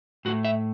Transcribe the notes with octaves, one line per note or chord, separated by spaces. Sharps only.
A2 A3 F#4
E5